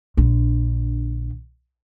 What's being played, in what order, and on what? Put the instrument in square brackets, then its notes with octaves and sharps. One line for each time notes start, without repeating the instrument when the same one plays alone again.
[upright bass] A#1 D3